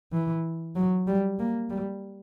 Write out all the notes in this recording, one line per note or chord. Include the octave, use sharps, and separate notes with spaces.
E3
F#3
G3
A#3
G3